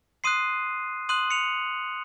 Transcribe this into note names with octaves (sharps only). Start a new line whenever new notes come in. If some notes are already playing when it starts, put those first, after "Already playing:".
C6 D#6 F#6 C7 D#7
C6 D#6 F#6 D#7 F#7
C#7 F7